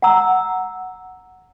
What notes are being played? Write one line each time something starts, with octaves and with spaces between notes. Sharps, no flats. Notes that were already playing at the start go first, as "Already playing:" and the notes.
F#5 A#5 E6